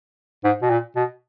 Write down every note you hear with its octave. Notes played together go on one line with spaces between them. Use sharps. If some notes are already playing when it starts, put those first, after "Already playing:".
G#2
B2
A#2
B2